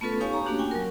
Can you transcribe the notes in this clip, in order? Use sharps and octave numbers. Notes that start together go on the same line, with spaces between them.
A3 B3 C#4 F4 A4 B4
D#4 G4 C#5 F5 G#5 C#6
A#5
A3 A#3 C#4 D4 F#4 G4
G5 G#5
F#3 A#4